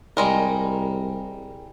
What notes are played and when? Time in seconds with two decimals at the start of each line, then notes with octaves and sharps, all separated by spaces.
0.17 C2 G3 G#3 A#4